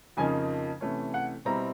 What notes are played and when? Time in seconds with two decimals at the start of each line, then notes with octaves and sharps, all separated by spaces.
0.17 F2 C#3 F3 A#3 D#4 G#5
0.81 C3 E3 A3 C#4
1.14 F#5
1.45 B2 G3 C4 E4 A#5